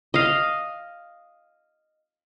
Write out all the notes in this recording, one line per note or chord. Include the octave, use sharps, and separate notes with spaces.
D#5 F5